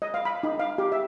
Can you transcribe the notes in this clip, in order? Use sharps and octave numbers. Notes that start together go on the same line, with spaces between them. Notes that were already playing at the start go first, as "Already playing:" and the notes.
D#5
F5
B5
D#4
F5
G4
E5